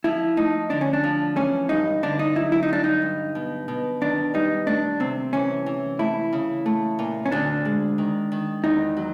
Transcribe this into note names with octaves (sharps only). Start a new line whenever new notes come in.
F3 E4
A3 D#4
D3 D4
C#4
D4
F3
E3 C#4
G2 D#4
D3 D4
D#4
F#3 E4
E4
D#4
G2 D4
D#4
G2
B2
B2
D#3 D4
G3 D#4
A3 D4
C3 C4
E3 C#4
E3
A3 E4
C#3
A3
A#2
C#4
D2 D4
G#3
D#3
D#3
E2 D#4
F#3